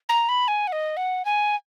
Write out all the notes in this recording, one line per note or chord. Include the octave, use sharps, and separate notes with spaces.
A#5
B5
G#5
F#5
D#5
F#5
G#5